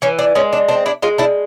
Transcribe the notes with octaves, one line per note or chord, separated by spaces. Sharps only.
E3 C#4
D4
G#3 C#4
D4
C4 D4
D4 E4
G#3 D#4 F4
D4 E4